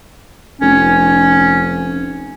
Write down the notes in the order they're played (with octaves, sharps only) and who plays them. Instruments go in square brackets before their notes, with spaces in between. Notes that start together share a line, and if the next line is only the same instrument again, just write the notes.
[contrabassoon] F1 [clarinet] C#4